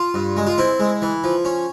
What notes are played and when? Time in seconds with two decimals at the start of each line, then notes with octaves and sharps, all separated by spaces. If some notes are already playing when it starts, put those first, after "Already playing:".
Already playing: F4
0.14 G2
0.37 G#3
0.47 F4
0.58 C4 E4
0.80 G#3
1.02 E3
1.24 F3
1.45 C#4